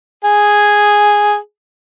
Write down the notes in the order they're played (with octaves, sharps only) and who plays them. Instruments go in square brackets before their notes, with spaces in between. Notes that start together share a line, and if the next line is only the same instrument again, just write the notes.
[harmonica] G#4